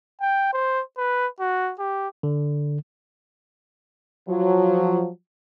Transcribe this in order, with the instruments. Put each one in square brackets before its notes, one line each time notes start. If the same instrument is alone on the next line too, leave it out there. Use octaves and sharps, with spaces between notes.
[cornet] G5
C5
B4
F#4
G4
[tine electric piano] D3
[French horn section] F3 F#3